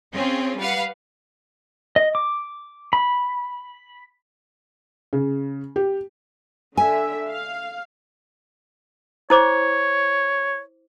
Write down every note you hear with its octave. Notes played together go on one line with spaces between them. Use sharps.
C4 C#4 F4 G#4
G3 B4 F5 F#5
D#5
D6
B5
C#3
G4
D3 E5 G#5
F5
E4 C5 C#5 D6